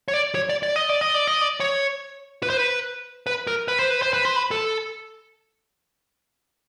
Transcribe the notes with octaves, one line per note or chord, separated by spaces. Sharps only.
C#5
D5
C#5
D5
D5
D#5
D5
D#5
D5
D#5
D5
C#5
B4
C5
B4
B4
A#4
B4
C5
B4
C5
B4
C5
B4
A4